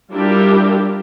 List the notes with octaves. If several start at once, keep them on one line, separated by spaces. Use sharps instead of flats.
G3 D4 E4 F4 G4 A#4